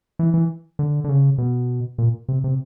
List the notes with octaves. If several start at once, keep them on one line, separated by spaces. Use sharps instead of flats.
E3
E3
D3
D3
C#3
B2
A#2
C3
C3